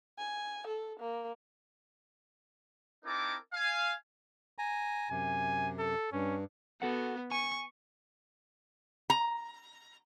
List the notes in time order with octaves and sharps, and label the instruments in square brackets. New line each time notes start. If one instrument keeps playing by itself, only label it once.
[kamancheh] G#5
A4
A#3
[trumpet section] C4 D#4 E4 A4 A#4 D6
F5 G#5
[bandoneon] G#5 A#5
[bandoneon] F#2 C3 [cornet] G#5
[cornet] A4
[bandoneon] G2 [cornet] C#4
[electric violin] B3 [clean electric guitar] F#4 A4 F#5
[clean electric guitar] G#5 [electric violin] C#6
[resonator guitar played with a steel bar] A#5